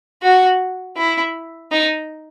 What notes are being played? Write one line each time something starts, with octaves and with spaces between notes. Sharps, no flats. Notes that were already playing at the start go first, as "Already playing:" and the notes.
F#4
E4
D#4